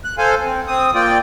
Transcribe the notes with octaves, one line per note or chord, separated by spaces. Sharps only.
F#6
A4 C5 F5 G#5
C4
C4 D#6
A#3 F4 D5 G5